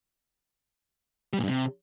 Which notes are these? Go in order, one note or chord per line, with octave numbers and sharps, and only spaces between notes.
G3
A#2
G2
C3